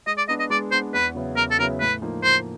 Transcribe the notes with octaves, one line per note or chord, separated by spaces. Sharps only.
G#3 D#5
D5
B3 D4 D#5
D#5
G#3 D5
B3 D4 C5
E2 B4
C#3 F#3 B3 E4
E2 A#4
A4
C#3 F#3 B3 E4 A#4
A2 B4
F3 A#3 D#4
A2 C5